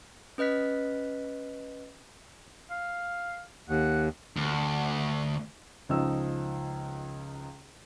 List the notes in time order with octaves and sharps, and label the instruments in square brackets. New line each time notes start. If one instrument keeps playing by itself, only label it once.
[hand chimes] C#4 B4 D#5 F#6 B6
[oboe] F5
[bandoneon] D#2 [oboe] F#5
[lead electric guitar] D2
[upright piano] C#2 F3 D#4 E6